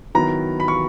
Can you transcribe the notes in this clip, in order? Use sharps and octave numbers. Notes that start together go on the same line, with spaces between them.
D#3 F#3 B3 E4 A#5
B5
C#6